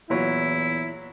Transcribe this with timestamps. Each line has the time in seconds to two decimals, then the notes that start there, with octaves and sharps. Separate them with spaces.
0.10 E2 A#2 F#3 E4